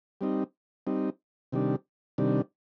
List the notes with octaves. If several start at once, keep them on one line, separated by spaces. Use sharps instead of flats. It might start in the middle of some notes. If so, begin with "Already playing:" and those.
G3 C4 D#4
G3 C4 D#4
C3 D#3 G3 D4
C3 D#3 G3 D4